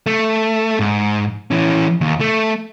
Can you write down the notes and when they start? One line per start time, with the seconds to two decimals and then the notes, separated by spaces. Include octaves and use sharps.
0.06 A3
0.79 G#2
1.51 E3 C#4
2.01 D#2
2.20 A3